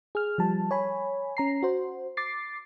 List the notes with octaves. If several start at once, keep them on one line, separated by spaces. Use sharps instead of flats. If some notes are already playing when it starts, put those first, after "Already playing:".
G#4 F6
F3 G3 A5
C#5 G#5 B5
C#4 A#5 C7
F#4 C5
D6 A6 C7